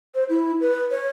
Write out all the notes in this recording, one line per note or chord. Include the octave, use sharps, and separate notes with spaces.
C5
E4
B4
C#5